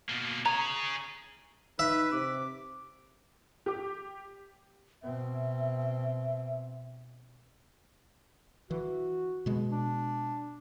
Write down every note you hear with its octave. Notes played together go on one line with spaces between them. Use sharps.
B2 A#3
G#4 C#5 A#5
D#4 B4 E5
C3 D6
G4 D6
B2 C4 E5
E3 F#4
B2 G#3
D4